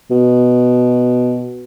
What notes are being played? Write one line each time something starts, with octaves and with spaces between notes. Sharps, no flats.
B2